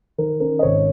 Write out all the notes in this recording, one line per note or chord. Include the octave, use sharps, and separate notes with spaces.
D#3 A#4
C#4 A#4
D#5
G#1 C#5